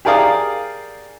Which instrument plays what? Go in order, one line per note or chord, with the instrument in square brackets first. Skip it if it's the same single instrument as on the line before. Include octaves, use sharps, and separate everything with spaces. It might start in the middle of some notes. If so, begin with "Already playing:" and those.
[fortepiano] G4 G#4 A#4 D5 F5 D#6